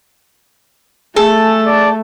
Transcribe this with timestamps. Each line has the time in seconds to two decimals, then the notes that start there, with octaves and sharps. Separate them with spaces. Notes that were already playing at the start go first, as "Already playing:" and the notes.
1.16 A3 G#4 A4
1.67 D5